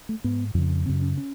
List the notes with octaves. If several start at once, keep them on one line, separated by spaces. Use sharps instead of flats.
A3
G#2 B3
F2 C#3
F#2 C#3 C4
C#4
C#4